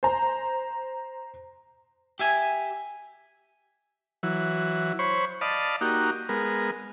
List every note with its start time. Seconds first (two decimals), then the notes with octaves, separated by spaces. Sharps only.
0.03 C5 A#5
2.19 G4 E5 G#5
4.23 E3 F#3
4.99 C5 C#5 B5 C#6
5.41 D5 D#5 F5 A5 B5
5.81 A#3 D#4 F#4 G4
6.29 G#3 B3 A#4